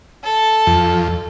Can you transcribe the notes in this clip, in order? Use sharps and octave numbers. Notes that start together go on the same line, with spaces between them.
A4
F2